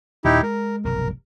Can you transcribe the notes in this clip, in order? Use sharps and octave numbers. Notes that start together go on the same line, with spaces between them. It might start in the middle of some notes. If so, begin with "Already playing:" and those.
D#2 A#2 D#4 E4 G4
G#3 A#4
F1 B1 G2 A#4